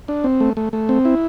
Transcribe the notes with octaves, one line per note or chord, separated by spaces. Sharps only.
D4
C4
A3
A3
A3
C4
E4